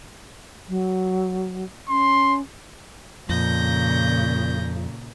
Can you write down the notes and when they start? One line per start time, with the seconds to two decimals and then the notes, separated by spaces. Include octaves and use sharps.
0.69 F#3
1.89 C#4 C6
3.29 F2 A#2 C#3 G6 A#6